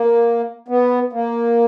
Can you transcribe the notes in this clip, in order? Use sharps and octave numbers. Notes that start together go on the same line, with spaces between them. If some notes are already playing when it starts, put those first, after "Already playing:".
Already playing: A#3
B3
A#3